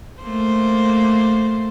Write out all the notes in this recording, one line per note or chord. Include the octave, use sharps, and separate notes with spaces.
A3 A#3 C5